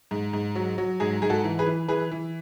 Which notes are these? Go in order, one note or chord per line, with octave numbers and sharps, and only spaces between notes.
G#2
G#2
F#3
F#3
G#2 G#4
G#2 G#4
F#4 A4
E3
G#4 B4
E3
E3 G#4 B4
E3